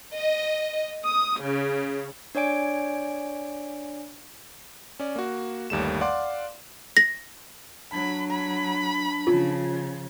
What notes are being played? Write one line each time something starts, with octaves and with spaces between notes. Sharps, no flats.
D#5
D#6
C#3
D4 C#5 D5 G#5 D7
C#4 D5
A#3 F#4
G1 D#2 G3 A3 E7
D5 F5 F#5 C6 D6
A#6
F#3 D4 B5
B5
C#3 F3 F4